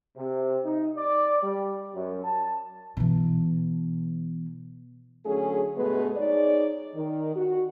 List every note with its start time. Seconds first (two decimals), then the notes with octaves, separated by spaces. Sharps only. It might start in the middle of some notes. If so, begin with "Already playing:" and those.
0.17 C3
0.65 D#4
0.97 D5
1.42 G3
1.95 F#2
2.24 A5
2.97 B2 E3
5.25 D3 F#3 A3 C#4 G#4
5.77 G2 B2 G#3 A3 B3 B4
6.16 D#4 G#4 C#5 D5
6.95 D#3
7.36 F#4